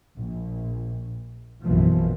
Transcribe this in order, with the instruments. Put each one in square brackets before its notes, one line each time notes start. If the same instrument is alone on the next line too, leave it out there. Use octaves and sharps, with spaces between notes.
[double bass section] A#1
A#1 F#2 B2 E3 F3